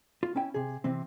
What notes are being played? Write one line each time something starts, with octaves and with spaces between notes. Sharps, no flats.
F4
C#4 E4 G5
C3 G#4
C3 E3 C4